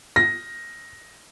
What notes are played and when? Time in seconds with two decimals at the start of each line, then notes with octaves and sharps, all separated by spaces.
0.16 A#6